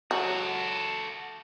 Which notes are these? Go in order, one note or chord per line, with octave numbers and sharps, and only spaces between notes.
F#3 F#4 A4